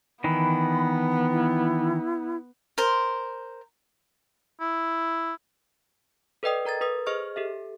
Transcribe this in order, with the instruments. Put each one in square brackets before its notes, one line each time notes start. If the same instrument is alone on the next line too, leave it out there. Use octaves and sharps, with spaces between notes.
[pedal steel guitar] D#3 E3 [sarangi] B3 [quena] B5
[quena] E4
[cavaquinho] A#4 C5
[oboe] E4
[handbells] A4 B4 D5 D#5 G5 D#6
A#4 A#5 G#6 A6
A4 B4 D#6
G#4 C5 D#5 C#6 F6
G4 A4 E5